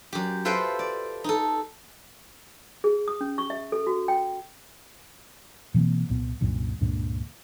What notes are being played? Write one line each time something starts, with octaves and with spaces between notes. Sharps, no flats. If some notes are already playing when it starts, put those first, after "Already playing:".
F#2 G4
F4 A4 B4 C5 E5 G5
D5
D#4 A4
G#4
D#6
C#4
C#6
E5
A4
F#4
G5
B2 E3 A#3 C4
C2 A#2 B3
C2 F#2 A#2 D3
C#2 G2 A#2 D3